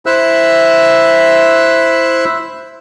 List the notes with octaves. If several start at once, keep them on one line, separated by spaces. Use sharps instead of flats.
E4 C5 E5 E6 F#6